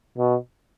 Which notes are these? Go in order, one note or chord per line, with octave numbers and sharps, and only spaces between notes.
B2